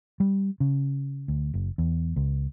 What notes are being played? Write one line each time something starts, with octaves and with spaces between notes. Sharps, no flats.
G3
C#3
D2
F#1
E2
C#2